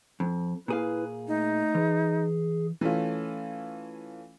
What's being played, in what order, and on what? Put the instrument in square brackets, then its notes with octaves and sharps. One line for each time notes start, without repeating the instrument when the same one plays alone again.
[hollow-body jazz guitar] F2
[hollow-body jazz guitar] A#2 G#4 F5 [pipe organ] E4 B4
[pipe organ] A3 [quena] D#4
[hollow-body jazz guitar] E3 [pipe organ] G#4
[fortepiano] E3 A3 C#4 F4